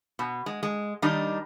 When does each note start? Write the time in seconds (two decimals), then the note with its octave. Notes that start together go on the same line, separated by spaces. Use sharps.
0.19 B2
0.46 G#3
0.63 G#3
1.02 D#3 G3 D4 D#4